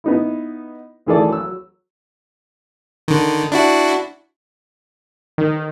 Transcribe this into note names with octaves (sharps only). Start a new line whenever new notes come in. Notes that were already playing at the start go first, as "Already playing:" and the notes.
B3 D#4 E4
D2 D#3 E3 G#4 A4 D5
F#3 E6
D3 D#3
D4 E4 F#4
D#3